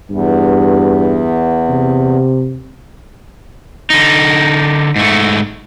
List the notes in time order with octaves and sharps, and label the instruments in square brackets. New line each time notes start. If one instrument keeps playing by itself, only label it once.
[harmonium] E2 [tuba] G2
[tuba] C3
[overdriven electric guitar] D3 D#4
G#2 A3